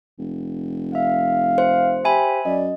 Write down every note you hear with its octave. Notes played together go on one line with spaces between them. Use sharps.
F1
E5 F5
C5
G4 E5 G#5 B5
F#2 D5 D#5